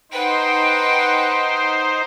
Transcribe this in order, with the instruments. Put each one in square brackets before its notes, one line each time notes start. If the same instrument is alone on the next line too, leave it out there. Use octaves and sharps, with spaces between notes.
[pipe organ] D#4 C5 [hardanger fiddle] B4 F#5 [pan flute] G5